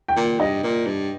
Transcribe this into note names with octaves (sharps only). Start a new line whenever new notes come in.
G5
A#2
G2 D#5
A#2
G2